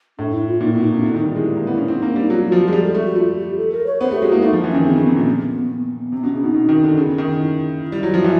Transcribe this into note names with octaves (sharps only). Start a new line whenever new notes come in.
A2 D4
E4
F4
A#2 D#4
B2 E4
D#4
C3 D4
D3 E4
D#3
D#4
G3
F4
G#3 E4
G3
A#3
B3
C#4
C4 E4
A#3 D#4
D4
G3 D#4
F#3 F4
F#4
F3 F4
G4
G#3
G3 G#4
A4
A3 G4
F#4
A3 F4
G4
A4
A#4
C#5
B3 C5
A3 G4
G#3 F#4
A#3 E4
A3 D#4
F3
E3
D#3 C#4
C#3 C4
C#3 B3
C3 C4
A#2 B3
C3 C4
B2 C#4
C#3 D4
B2 D#4
B2
D#3
D3
C#3
D#3
E4
G3
F#3
F3
E3